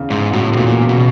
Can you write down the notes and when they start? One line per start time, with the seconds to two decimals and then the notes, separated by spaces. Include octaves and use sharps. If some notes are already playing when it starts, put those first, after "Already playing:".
Already playing: E2 C#3
0.10 E2 G#2
0.33 A2 F#3
0.53 A2
0.57 E2 A#2
0.81 C#3
0.89 B2